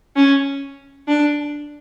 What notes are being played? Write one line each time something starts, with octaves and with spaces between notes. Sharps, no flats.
C#4
D4